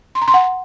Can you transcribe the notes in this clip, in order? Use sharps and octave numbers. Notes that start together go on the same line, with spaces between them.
C6
A#5
C6
F#5